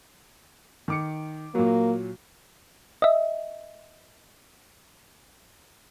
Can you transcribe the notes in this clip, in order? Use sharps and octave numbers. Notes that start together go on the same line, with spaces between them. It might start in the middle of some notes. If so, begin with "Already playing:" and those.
D#3 D6 C#7
A#2 F#3 A#3
D#5 E5